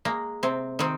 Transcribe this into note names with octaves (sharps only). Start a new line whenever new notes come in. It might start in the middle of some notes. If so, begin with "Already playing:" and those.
G#3 A#3
C3 C4
D#3 C4